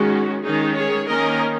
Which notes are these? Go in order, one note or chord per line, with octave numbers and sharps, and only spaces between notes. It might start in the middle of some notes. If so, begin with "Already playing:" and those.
Already playing: D#3 G#3 C#4 F#4
D#3 G#3 C#4 D#4 G#4
G#4 C#5
D#3 A#3 C#4 A#4 D#5